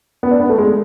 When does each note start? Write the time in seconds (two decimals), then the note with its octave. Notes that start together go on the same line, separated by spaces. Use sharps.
0.23 B3
0.31 D4
0.40 B3
0.50 A3
0.58 G#3